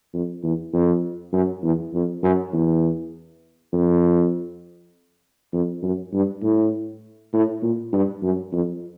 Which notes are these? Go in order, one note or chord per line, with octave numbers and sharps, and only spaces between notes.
F2
E2
F2
F#2
E2
F2
F#2
E2
F2
F2
F#2
G2
A2
A2
A#2
G2
F#2
F2